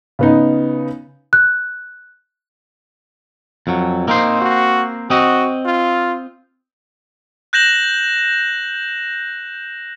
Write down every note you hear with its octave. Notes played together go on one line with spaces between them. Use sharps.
C#3 B3 D#4
F#6
F2 F#3
A#3 C4 D#4 C5
F#4
C4 F#4 D#5
F4
F#6 G6 A#6 E7 F#7